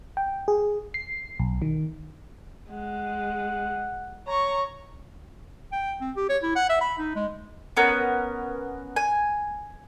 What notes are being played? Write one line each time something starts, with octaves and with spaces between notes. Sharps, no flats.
G5
G#4
C7
B1
D#3
G#3 F#5
C#5 A#5 C#6
G5
C4
G4
C#5
E4
F#5
E5
B5
D#4
G#3
B3 C#4 A#4
G#5